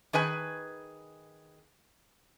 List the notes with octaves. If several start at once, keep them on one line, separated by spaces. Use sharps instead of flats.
D#3 G#4 B4 G#5